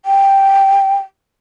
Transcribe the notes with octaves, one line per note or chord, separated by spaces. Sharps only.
G5